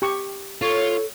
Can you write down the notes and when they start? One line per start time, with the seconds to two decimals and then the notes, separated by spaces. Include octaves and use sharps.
0.02 G4 C#6
0.62 F4 A4 C#5